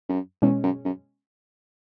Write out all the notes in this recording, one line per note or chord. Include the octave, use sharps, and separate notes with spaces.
F#2
E2 B2 G#3 C#4
F#2
F#2